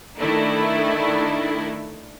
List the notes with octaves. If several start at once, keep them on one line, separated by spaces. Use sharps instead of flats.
D#3 A3 D4 E4